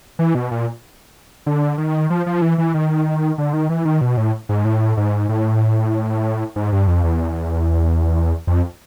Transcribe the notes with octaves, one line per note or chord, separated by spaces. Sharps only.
E3
B2
A#2
D3
D#3
F3
F3
E3
E3
D#3
D3
D#3
E3
D#3
B2
A2
G#2
A2
G#2
A2
G#2
G2
F2
E2
F2